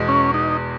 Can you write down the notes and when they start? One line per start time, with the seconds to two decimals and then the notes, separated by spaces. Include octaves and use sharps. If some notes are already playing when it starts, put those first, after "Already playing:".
Already playing: E2 B2 G#3
0.08 C#4
0.34 D#4